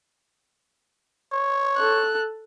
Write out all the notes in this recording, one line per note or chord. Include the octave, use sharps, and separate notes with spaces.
C#5
A4 F#6